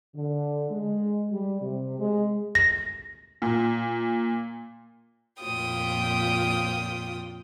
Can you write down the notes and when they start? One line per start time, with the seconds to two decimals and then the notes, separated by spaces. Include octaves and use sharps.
0.16 D3
0.70 G#3
1.30 G3
1.62 C3
2.00 G#3
2.55 A#6
3.42 A#2
5.42 F2 A#2 F4 G5 D#6